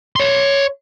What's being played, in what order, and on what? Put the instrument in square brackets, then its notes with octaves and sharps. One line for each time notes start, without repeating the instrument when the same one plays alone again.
[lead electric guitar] C#5 C6